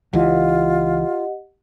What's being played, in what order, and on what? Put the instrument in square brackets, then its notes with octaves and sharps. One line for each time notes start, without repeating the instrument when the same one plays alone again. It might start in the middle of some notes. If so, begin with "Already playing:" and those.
[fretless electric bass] C#2 E3 [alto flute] F4 [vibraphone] G4 D#5 F#5